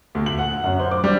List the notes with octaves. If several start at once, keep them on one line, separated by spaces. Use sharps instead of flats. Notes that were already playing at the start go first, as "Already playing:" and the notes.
D2
F#7
F#5
F#2
C5
D6
G3